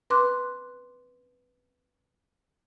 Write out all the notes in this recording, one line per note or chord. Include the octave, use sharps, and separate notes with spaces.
B4 C6 D6 F#6